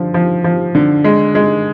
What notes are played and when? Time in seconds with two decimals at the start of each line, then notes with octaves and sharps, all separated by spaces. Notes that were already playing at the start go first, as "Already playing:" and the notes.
Already playing: D3 F3
0.14 F3
0.44 F3
0.75 D3
1.04 G#3
1.35 G#3